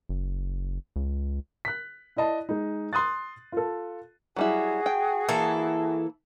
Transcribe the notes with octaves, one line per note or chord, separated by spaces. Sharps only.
F#1
C#2
F#6 B6
E4 D5 D#5 A5
G#3 D#4
C6 D#6 F#6 A6
F4 A4
F#3 G3 E4 F#4 G#4 G#5
G5
E3 A#3 E4 A4